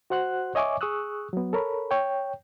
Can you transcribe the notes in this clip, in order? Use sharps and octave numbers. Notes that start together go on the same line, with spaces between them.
F#4 C5 F#5 C6 F#6
C#5 D#5 E5 G#5 C#6 D6
G#4 C#6 D#6 E6 F#6
F#3 B3
A4 A#4 C#5 B5
C#5 G5